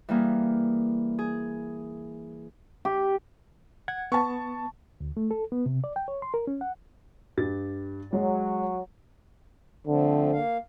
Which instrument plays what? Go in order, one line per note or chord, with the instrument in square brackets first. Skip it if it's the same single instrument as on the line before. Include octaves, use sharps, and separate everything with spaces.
[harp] E3 G3 A#3 G#4
G#4
[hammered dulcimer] G4
[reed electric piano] F#5 G#6
[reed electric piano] B3 [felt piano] A5 C#6
[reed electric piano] D2
A3
A4
B3
C3
D5
G5
C#5
C6
A#4
C#4
F#5
[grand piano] G2 G4 A6
[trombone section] F#3 [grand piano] G#3
[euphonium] D3 [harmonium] F3 A3 C4
[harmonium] A#3 F5